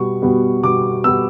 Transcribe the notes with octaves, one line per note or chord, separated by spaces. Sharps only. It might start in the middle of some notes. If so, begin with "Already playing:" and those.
Already playing: B2 G3 B3 C#6
B2 G3 B3
B2 G3 B3 D6
B2 G3 B3 E6